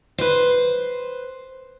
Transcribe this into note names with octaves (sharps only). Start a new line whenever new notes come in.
B4 C5